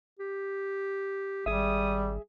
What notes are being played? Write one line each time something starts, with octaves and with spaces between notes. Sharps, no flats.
G4
G#1 G3 G#4 E5 D#6